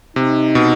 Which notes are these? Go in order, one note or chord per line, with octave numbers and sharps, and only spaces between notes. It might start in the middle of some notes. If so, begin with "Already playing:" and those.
C3 D#4
B2